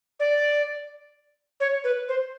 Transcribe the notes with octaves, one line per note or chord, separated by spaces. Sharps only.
D5
C#5
B4
C5